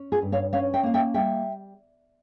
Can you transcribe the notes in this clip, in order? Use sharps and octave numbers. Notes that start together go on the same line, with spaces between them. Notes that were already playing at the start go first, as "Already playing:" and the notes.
Already playing: C#4
F4 G#4
G2
C#5 F5
C#4 C#5 F5
E5 G5
A#3 F5
E5 G5
G3 E5 G5